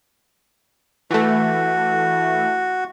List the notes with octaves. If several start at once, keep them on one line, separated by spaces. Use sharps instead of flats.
E3 A3 F#4